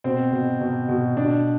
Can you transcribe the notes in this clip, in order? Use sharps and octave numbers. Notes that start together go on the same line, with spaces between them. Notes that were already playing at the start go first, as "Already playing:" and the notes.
B2 C4
B2
B2
B2
B2 D4